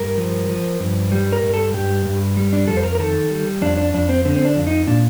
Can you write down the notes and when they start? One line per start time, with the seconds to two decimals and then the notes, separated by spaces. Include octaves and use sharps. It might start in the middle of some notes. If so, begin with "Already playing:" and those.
Already playing: G2 A#4
0.17 F3
0.49 F3
0.80 G2
1.12 G3
1.33 A#4
1.43 G2
1.54 A4
1.74 G2 G4
2.05 G2
2.37 G3
2.53 D4
2.68 F2 A4
2.77 C5
2.83 A#4
2.95 A#4
2.99 D#3 A4
3.31 G3
3.62 F2 D4
3.77 D4
3.94 F2 D4
4.09 C4
4.25 D3 C4
4.36 C4
4.45 D4
4.56 F2
4.67 D#4
4.87 A#2 D4